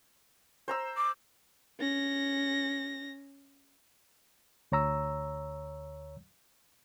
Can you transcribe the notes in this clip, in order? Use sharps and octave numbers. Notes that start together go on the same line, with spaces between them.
C5 A#5 E6
D6
C#4 A#6
D2 C#5 A#5 E6